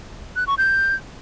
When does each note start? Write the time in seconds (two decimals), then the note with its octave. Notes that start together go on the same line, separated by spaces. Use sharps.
0.36 F#6
0.47 C#6
0.58 G6